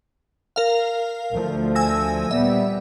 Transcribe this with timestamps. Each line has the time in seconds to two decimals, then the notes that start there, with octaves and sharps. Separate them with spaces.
0.56 A#4 F5
1.32 D2 F3 A3
1.75 G#5 E6 A#6
2.31 A#2 G3 B3 E5